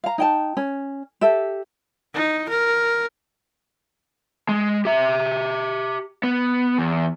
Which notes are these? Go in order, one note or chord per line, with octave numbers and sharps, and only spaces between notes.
F5 A#5
D#4 G5 A5
C#4
G4 A4 E5
D#4
A#4
G#3
G4 E5
B3
E2